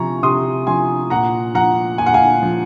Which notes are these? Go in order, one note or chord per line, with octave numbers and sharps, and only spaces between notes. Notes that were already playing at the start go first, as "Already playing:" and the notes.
Already playing: C3 F3 G#5 A#5 C#6
C3 C6 D#6
F3 G#5 C6
A#2 F#5 A#5
F3 F#5 A#5
A#2 G#5
F#5
F5 G#5
F3